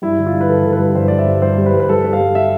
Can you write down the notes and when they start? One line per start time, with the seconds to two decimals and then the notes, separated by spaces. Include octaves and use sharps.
0.02 G2 E4
0.19 D3
0.26 F4
0.34 G2
0.41 B4
0.49 D3 A4
0.65 D3 A4
0.73 B4
0.80 G3
0.95 G2 C5
1.08 G2 D5
1.19 E5
1.27 G3
1.42 G2 C5
1.58 G3
1.66 B4
1.74 G2
1.80 B4
1.89 G3 A4
2.04 G3
2.13 F5
2.21 G3
2.35 G3 E5